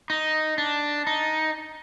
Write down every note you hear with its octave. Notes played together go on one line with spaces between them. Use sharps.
D#4
D4
D#4